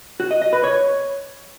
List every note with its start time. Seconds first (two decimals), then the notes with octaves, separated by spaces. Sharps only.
0.20 F#4
0.31 D#5
0.42 D#5
0.53 B4
0.64 C#5